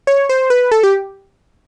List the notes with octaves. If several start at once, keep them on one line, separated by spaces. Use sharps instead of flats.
C#5
C5
B4
A4
G4